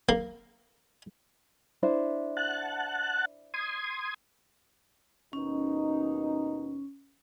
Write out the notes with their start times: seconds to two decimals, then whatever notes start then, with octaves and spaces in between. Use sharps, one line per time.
0.09 A#3
1.83 D4 E4 C5
2.37 F#5 A5 F#6
3.54 C6 D#6 G#6
5.33 D#2 B2 C#4 D#4